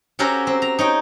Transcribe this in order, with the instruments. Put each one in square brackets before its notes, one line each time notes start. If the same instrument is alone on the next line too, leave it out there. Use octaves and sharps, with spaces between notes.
[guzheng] C#4 F#4 G4 A4 A#4 C5
C4
A#5
D#4 C#5 G5